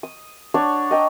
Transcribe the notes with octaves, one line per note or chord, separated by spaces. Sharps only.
D#6
D4 C#5 F#5 C#6
D#5 G5 A#5